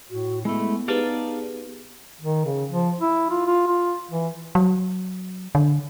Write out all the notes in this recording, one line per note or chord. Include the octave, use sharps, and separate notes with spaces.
A2 F#4
G#3 A3 B3 E4
D#4 G4 G#4 B4 D5 F5 A5
D#3
C#3
F3
E4
F4
F4
F4
E3
F#3
D3